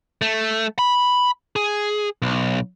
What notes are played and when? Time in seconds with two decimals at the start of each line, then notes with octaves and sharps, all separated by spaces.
0.22 A3
0.79 B5
1.56 G#4
2.22 B1